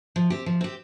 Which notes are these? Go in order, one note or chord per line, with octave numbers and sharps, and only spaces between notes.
F3
C4 G4
F3
C4 G4